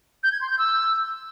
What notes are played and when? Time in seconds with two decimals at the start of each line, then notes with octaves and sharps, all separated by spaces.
0.23 G6
0.32 G#6
0.41 C6
0.50 G6
0.59 E6